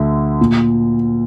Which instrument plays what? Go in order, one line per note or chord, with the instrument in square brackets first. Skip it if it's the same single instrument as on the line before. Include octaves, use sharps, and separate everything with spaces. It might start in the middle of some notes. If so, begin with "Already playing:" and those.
Already playing: [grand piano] D2 D3 E5
A#2